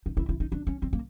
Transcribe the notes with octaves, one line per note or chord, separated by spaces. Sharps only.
D#4
E4
E4
D#4
D4
C#4
C4
A#3